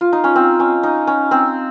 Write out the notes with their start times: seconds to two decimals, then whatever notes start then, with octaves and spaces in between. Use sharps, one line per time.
0.01 F4
0.13 D#4
0.24 C#4
0.35 C4
0.60 C#4
0.83 D#4
1.07 C#4
1.31 C4